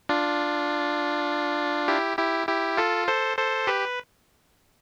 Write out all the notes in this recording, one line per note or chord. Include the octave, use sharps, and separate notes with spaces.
D4 F4
E4 G4
E4 G4
E4 G4
F4 A4
A4 C5
A4 C5
G4 B4